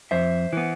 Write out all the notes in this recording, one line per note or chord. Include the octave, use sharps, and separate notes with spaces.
F2 C5 E5
E3 B3